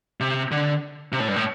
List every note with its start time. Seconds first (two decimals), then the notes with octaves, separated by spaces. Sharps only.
0.20 C3
0.51 D3
1.12 C3
1.20 A2
1.28 G2
1.36 A2